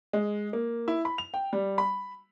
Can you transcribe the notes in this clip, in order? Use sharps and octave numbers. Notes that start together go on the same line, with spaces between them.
G#3
A#3
E4
B5
F7
G5
G3
B5